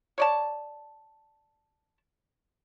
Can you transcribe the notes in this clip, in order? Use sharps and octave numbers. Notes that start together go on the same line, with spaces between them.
C#5 D5 A5